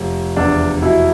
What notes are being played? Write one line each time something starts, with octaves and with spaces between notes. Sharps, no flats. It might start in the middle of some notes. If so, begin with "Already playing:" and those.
Already playing: F1
E2 D4
B2 E4